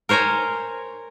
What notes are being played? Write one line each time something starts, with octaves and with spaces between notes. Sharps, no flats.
A#4 C5 C#5 G#5 A#5